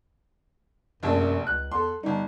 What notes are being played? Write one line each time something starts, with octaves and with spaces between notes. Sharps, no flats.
F1 A#1 F#2 A5
C#2 F#6
E2 A4 C6
G1 G3 D#4